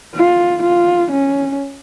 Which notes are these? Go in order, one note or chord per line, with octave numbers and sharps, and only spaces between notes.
F4
F4
C#4